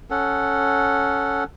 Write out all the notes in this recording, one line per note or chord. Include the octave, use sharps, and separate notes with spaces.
C#4 A4 F#5